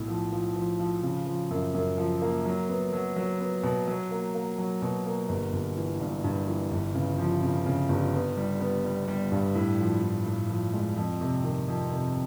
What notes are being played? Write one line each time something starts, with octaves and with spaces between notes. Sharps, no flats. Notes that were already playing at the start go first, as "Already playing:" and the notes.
Already playing: B1 A2
F3
F3
F3
F3
C#3
F3
F#2
F#2
F3
A#3
F#3
B3
F#3
F#3
B3
B2
F#3
A#3
A#3
F#3
B2
A#3
G1
G1
E3
G2
G2
E3
G1
C#3
F3
C#3
C#3
G1
B3
G3
B3
G3
G3
G2
A2
F3
A2
A2
F3
G#3
F2
C3
D#3
F2
C3